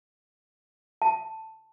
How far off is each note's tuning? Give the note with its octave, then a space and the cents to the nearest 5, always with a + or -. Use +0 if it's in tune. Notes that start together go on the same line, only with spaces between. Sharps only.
A5 +5